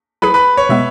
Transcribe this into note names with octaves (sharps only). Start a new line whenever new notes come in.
F#3 E4 G#4 B4 B5
B4 B5
C#5
B2 G#3 B3 E5